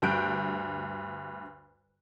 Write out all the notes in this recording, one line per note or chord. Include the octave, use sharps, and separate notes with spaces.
D2 G2 F#6 G6 D7